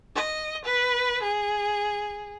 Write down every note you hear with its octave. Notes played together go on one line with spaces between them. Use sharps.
D#5
B4
G#4